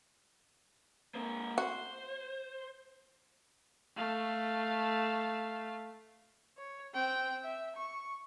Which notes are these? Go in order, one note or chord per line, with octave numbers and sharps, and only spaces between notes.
A#3 C4
F#4 C5
A3 F5
C#5
C4 G5
E5
C#6